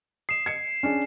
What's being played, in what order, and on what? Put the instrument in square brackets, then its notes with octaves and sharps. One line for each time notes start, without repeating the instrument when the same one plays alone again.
[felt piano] D#6 [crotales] C7 E7
[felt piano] G#6 C#7
C#4 D4 G#4